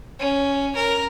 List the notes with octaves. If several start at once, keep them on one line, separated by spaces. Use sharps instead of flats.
C#4
A#4